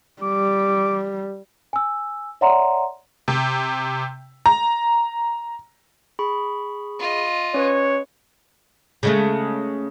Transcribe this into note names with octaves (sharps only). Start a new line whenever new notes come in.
G3 D6
G#5 E6
C#5 D5 E5 F#5 A#5 C6
C3
A#5
G#4 B5 C#6
F4 D#5
C#4 B4 C#5
C#3 G#3 A3